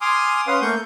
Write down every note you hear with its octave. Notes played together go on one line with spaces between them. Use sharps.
G#5 C6 D6 D#6 F6
C#4 B4 F5 F#5 C6 D#6
A3 A#3 C#6 G6